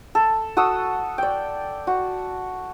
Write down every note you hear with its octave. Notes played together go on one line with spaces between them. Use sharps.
A4
F#4 A4 D#6 E6
D5 G5
F#4